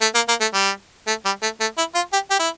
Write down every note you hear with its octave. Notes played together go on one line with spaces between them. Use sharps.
A3
A#3
A#3
A3
G3
A3
G3
A3
A3
E4
F4
G4
G4
E4